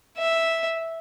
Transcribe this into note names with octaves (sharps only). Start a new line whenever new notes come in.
E5